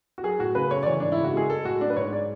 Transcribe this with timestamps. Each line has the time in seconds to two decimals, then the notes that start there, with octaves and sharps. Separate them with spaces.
0.18 F#4
0.24 F#3 G#4
0.39 A2 F#4
0.55 C#3 B4
0.71 A3 C#5
0.83 D5
0.86 E3 C#5
1.00 G#2 D4
1.12 E4
1.18 C#3
1.24 F#4
1.34 G#3 G#4
1.49 G#3 A4
1.65 A2 F#4
1.81 F#3 D4
1.90 B4
1.97 G#2 C#5
2.13 G#3 D5